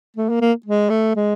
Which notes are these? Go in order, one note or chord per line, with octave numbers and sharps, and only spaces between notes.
A3
A#3
A#3
G#3
A3
G#3